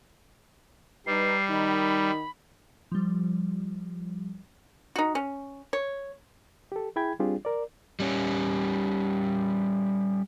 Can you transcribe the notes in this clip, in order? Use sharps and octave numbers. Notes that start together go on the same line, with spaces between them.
G3 D#4 B4 C7
D#3 D#4 B5
F3 G3
D#4 F#4
C#4
C#5
G4 A4
E4 G#4 G5 B5 G#6
G3 C4 D4 F4 G4 G#4
A#4 D5
G3 C#4